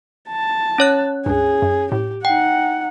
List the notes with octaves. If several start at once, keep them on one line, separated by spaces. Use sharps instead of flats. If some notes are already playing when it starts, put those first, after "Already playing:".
A5
C#4 C#5 F#6
C#2 G2 G#4
F#2
A2 G4
D#4 F#5 G5